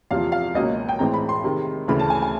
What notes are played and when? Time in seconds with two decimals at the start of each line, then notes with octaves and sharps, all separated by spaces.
0.11 E2 C3 F3 F5
0.32 F5
0.54 C#2 B2 F#3 A#3 C#4 D#5
0.89 G5
0.99 A2 E3 G#3 C4 A#5
1.14 B5
1.29 C6
1.44 C3 D#3 G#3
1.88 D2 C#3 E3 A3 B5
1.99 A5
2.10 G#5
2.22 G#5